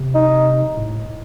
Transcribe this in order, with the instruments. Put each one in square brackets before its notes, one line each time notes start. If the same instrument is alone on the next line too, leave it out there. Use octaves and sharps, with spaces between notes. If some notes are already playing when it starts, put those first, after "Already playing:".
Already playing: [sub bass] C3
[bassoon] D#4
[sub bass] A2